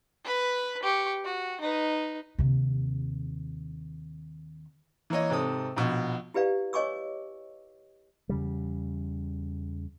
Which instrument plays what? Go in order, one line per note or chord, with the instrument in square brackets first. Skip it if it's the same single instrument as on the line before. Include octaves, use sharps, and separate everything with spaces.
[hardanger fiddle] B4 B5
G4 C#6
F#4
D#4 B4
[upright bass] D#2 C3
[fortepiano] E3 A#3 C#5 D#5
G#2 C3 A4 D#6
A#1 B2
[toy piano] E4 G4 B4 D5 F5
C#5 D#5 G#5 C#6 D6 E6
[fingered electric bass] E2 C#3 G3